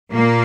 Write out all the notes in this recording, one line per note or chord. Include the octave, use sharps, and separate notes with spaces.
A#2 A#3